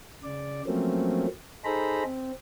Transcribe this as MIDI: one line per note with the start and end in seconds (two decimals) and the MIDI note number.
0.24 0.62 49
0.24 0.62 74
0.67 1.26 53
0.67 1.26 54
0.67 1.26 57
0.67 1.26 58
0.67 1.26 60
0.67 1.26 61
1.65 2.03 63
1.65 2.03 68
1.65 2.03 69
1.65 2.03 72
1.65 2.03 82
1.65 2.03 83
2.04 2.32 60